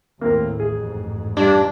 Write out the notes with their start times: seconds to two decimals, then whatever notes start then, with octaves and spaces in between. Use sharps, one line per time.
0.21 D#2 A2 A#3 C4 A#4
0.60 A1 F2 G#2 G#4
1.37 G2 D4